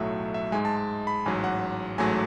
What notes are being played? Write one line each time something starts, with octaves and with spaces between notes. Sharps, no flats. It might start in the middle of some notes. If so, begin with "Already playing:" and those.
Already playing: B1 A2 F#3 A3 E5
E5
G#2 G#3 G#5
A5
A5
B5
A1 G#2 F#3 G#5
F#5
A1 G#2 F#3 A3 G#5